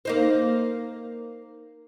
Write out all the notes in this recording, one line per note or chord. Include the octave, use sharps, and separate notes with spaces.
A#3 D#4 C5